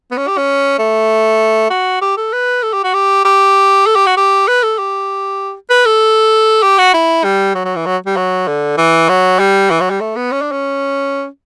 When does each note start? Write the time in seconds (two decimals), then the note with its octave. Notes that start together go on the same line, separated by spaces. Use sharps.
0.11 B3
0.17 C#4
0.28 G4
0.37 C#4
0.79 A3
1.70 F#4
2.02 G4
2.17 A4
2.32 B4
2.63 A4
2.73 G4
2.84 F#4
2.94 G4
3.25 G4
3.86 A4
3.96 G4
4.06 F#4
4.17 G4
4.48 B4
4.63 A4
4.78 G4
5.70 B4
5.86 A4
6.63 G4
6.78 F#4
6.94 E4
7.24 G3
7.55 F#3
7.65 F#3
7.76 E3
7.86 F#3
8.06 G3
8.16 F#3
8.47 D3
8.78 E3
9.09 F#3
9.39 G3
9.70 E3
9.80 F#3
9.90 G3
10.01 A3
10.16 B3
10.32 C#4
10.41 D4
10.52 C#4